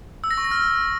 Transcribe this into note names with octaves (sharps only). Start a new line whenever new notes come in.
E6
A#6
C#6
A#6
F6